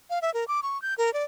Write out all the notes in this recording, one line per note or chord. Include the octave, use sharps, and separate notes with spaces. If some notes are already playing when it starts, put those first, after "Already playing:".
F5
E5
A#4
D6
C#6
G6
A#4
D5